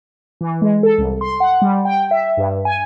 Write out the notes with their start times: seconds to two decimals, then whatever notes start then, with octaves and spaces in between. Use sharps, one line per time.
0.41 E3
0.62 G#3
0.83 A4
0.98 C2
1.21 C6
1.40 F#5
1.62 G3
1.85 G5
2.11 E5
2.37 G2
2.65 G#5